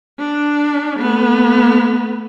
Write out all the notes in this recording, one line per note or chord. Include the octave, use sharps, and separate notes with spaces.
D4
A3 B3